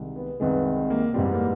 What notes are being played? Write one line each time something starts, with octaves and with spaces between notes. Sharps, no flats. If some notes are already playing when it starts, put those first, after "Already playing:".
Already playing: C2 C3 D#3 G#3
B3
C2 C3 D#3 G#3 B3
A#3
G#2 E3 G3 C4
B3
A#3